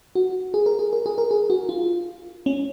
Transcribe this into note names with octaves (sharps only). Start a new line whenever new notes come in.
F#4
G#4
A#4
G#4
A#4
G#4
A#4
G#4
F#4
F4
C#4